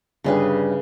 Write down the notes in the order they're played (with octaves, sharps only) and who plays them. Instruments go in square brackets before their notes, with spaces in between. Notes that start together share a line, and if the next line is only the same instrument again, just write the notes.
[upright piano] G1 G2 G3 [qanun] C#3 G#4 B4